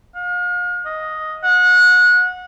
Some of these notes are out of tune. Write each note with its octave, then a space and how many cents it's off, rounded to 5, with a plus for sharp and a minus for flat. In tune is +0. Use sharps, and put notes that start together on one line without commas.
F5 +40
D#5 +5
F#5 -25